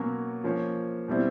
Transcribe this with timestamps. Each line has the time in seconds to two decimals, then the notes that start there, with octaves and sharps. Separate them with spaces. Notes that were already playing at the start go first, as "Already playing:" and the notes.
Already playing: B2 F#3 A#3 C#4
0.44 F3 A#3 C#4
1.08 B2 G3 C4 E4